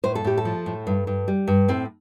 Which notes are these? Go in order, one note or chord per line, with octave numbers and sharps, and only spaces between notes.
A2 C5
A4
A2 G4
A4
F3
A2
G2
G2
G3
G2
A2 C4